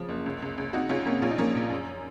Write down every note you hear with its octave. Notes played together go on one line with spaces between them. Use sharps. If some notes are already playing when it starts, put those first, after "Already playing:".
Already playing: C#3 F3
F#1
C#2
C#2
C#2
C3 D#4 F#4
C#2 C#4 F4
C3 A#3 C#4
A#1 C#4 F4
D#4
F3 A#3 C#4
A#1
F#2